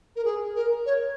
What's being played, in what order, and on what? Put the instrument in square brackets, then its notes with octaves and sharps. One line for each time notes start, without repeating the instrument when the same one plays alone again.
[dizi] A#4
G#4
A#4
C#5